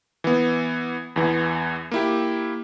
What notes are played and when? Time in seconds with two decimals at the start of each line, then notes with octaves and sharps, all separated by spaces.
0.24 E3 B3
1.16 E2 E3 B3
1.92 A#3 E4 G4